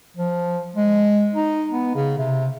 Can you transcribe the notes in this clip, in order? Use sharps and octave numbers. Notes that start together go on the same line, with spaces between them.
F3
G#3
D#4
B3
C#3
C3